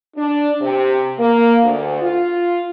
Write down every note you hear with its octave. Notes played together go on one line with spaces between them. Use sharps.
D4
C3
A#3
D2
F4